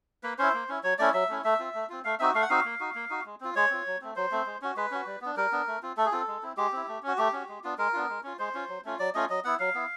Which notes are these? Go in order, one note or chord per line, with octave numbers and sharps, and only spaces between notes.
A#3 B4
C#4 E4 C5
A#3
C#4 E4
F#3 C#5
A3 C#4 E4 D5
F#3 E5
A3 C#4 E4
A3 E5
C4 F4
A3
C4 F4
A3 F5
C4 D#4 F#4 E5
A3 F5
F#5
C4 D#4 F#4 F5
A#3
D#4 F#4
A#3
D#4 F#4
G#3
C4 F4
G#3 C#5
C4 F4
F#3
A3 C4
F#3 C5
A3 C4
G#3
C#4 F#4
G#3 B4
C#4 F#4
G3
B3 D4
G3 A#4
B3 D4
A3
C4 F4
A3 A4
G#4
C4 F4 A4
G#3
C4 E4
G#3 G4
C4 E4
A3
C#4 F#4
A3 G4
C#4 F#4
G#3
B3 D4 F4
G#3 A#4
B3 D4 F4
G#3
C#4 F4
G#3 C5
C#4 F4
F#3
A3 C#4 F4
F#3 D5
A3 C#4 F4 D#5
F#3 D#5
B3 E4 F#5
F#3 F5
B3 E4